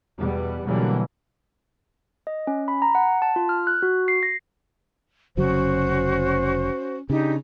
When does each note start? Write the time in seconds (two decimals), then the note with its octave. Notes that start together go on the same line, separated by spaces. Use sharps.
0.17 E2 B2 G3 B3
0.65 B2 D3 E3 F#3 G3 A#3
2.27 D#5
2.47 C#4
2.68 B5
2.82 A#5
2.95 F#5
3.22 A5
3.36 F4
3.49 F6
3.67 F#6
3.83 F#4
4.08 C7
4.23 A#6
5.37 F1 C#3 F#3 C#4 F#4 C5
7.10 C#3 D4 D#4 G4